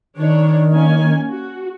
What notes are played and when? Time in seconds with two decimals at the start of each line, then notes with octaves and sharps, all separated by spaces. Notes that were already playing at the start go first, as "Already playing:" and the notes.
0.17 D#3 D4 C#5
0.70 A#3 C#4 G#5
1.29 F#4